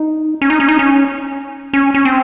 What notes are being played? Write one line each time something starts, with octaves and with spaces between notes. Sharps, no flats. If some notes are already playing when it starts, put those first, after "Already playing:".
Already playing: D#4
C#4
D#4
C#4
D#4
C#4
C#4
C#4
C4